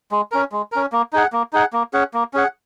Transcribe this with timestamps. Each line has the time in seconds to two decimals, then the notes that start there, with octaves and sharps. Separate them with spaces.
0.11 G#3
0.32 C#4 A#4
0.52 G#3
0.72 C#4 A#4
0.92 A#3
1.13 D#4 G#4 F#5
1.33 A#3
1.53 D#4 G#4 F#5
1.73 A#3
1.93 C#4 G#4 F#5
2.14 A#3
2.33 C#4 G#4 F#5